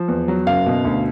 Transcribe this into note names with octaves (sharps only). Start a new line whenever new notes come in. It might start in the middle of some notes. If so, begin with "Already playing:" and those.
Already playing: F3
E2
F#3
F#1 F5
B2
D2